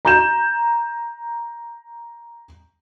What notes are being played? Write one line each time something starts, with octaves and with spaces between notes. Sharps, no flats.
A#5 G6 E7